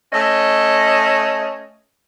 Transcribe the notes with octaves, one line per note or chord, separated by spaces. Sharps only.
A3 C#4 D#5